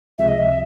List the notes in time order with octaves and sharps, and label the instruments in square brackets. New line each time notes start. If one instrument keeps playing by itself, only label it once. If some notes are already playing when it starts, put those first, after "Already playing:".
[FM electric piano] C#2 C3 F3 G#3 [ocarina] E5
[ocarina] D#5
E5